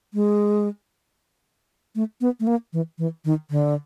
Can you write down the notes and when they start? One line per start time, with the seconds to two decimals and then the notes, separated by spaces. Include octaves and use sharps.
0.14 G#3
1.95 A3
2.21 B3
2.40 A3
2.47 A#3
2.73 E3
2.98 E3
3.25 D#3
3.51 D3